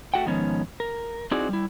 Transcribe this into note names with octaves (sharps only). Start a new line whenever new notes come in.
A3 F#4 F#5 G5
G#2 D#3 F3 B3 C#4
A#4
C4 D#4 E4 F#4 G#4 D5
G3 E4